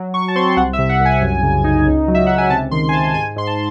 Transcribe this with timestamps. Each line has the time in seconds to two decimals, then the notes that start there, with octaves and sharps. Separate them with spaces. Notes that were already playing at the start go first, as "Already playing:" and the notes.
Already playing: F#3
0.14 F#3 C#6
0.28 A5
0.35 C4 C6
0.57 C2 F#5
0.73 E5
0.78 C3
0.89 F#5
1.00 C2
1.05 G#5
1.21 F#2
1.43 C#3
1.64 D#4
1.86 C#2
2.08 F#3
2.15 E5
2.27 C#2 F#5
2.38 G#5
2.50 C3 A5
2.71 D#3 C6
2.89 G#5
2.93 C3 A5
3.14 G#2 G#5
3.36 G#2 C6
3.47 A5